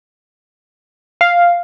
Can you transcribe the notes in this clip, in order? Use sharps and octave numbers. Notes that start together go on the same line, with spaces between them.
F5